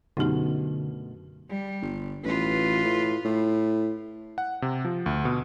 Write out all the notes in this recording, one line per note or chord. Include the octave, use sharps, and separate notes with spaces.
F#2 B2 D3 A3 D#4 G4
G3
G1
A1 F4 B4
A2
A2
F#5
C3
F3
D2
B2